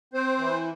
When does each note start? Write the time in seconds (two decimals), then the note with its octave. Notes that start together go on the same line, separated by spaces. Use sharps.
0.14 C4 C5
0.38 E3